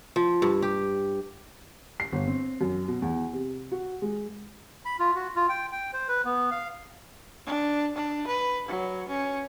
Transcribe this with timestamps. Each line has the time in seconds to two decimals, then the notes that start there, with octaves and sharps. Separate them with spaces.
0.16 F3
0.42 G2
0.62 G4
2.00 C7
2.13 G1
2.27 C4
2.61 F#2
2.88 B2
3.02 E2
3.33 C3
3.72 F#4
4.02 G#3
4.86 B5
5.00 F4
5.15 F#4
5.36 F4
5.49 G5
5.72 G5
5.93 C5
6.08 B4
6.25 B3
6.51 F5
7.46 D4
7.95 D4
8.27 B4
8.68 F#3
9.08 C#4